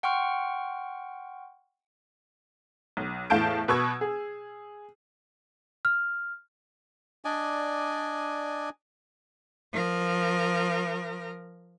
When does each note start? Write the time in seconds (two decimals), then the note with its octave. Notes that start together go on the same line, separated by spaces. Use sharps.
0.03 F#5 G5 C6 C#6 F6
2.97 B1
3.30 E2 A2 F5 A5 G6 D7
3.68 B2 B4 C#6 E6 G#6
4.01 G#4
5.85 F6
7.25 D4 D5 D#5 G#5
9.73 F3 A#4